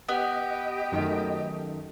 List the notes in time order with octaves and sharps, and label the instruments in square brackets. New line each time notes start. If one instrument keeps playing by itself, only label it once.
[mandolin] B3 [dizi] G4 [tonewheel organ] D#5
[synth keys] F#2 D#3 A3